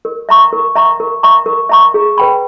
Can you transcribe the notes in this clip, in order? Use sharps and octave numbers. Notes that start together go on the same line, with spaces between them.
A#4
E5 A#5 C#6
A#4
E5 A#5 C#6
A#4
E5 A#5 C#6
A#4
E5 A#5 C#6
G#4
B4 G5 B5